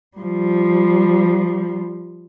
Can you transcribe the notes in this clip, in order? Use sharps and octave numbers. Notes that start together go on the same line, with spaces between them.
F3 G3